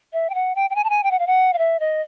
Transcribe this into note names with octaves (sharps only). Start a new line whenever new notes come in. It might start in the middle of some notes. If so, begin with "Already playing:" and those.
E5
G5
F#5
G5
G5
G#5
A5
G#5
G5
F#5
F5
F#5
F5
E5
D#5